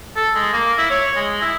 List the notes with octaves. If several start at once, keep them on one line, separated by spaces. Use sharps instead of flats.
A4
G#3
A#3
E4
C#5
G#3
E4